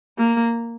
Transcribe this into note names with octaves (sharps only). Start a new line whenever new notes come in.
A#3